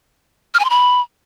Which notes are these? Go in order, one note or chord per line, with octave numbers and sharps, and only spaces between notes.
F6
G#5
C6
B5